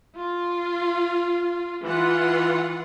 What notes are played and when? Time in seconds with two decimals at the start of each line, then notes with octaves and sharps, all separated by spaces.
0.15 F4
1.83 E3 F4 F#5